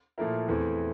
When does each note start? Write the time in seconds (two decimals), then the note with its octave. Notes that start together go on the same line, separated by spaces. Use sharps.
0.18 A#2 F3 A3 E4 A#4
0.48 E2 E3 A3 C4